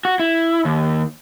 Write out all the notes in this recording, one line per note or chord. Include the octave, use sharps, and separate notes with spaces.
F#4
E4
D#2